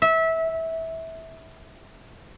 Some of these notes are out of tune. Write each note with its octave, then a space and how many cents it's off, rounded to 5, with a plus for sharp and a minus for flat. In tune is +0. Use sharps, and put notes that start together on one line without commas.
E5 -20